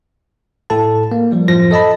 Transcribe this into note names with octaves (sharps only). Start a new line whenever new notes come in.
A2 A4 A5
A#3
F3 G3
F#2 A2 F3 A#6
A4 D#5 A5 B5